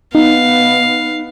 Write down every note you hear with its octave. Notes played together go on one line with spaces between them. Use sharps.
B3 D#4 F5